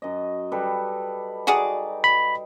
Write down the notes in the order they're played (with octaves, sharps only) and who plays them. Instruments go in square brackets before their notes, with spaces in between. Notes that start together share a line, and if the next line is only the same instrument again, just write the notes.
[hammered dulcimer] F#2 D#5
G3 A4 B4
[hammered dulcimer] D#4 [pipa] F#4 G#4 D5
[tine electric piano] B5